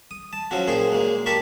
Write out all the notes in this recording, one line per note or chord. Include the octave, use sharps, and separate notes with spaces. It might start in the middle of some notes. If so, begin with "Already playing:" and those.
D#6
A5
F3 F#3 C#4 F#4
A#2 G#4 C5 C#5 G5
G#3 A#3
G4 A#4 A5 B5 C#6